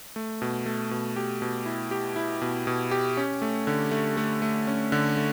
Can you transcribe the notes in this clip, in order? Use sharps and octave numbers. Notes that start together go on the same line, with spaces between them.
A3
B2
A3
B2
G4
B2
E4
G4
E4
B2
B2
G4
C#4
A3
D3
A3
A3
A3
C#4
D3
A3